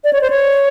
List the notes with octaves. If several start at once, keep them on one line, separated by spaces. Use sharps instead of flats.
D5
C#5
C5
C#5